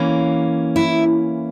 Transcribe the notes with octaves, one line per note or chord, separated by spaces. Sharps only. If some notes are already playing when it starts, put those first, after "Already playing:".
Already playing: E3 A#3 C#4
E4